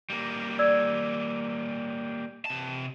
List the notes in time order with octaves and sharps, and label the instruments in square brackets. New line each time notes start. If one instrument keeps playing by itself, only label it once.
[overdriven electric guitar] G3 A#3
[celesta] D5 E6 G#6
[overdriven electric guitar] C3 A5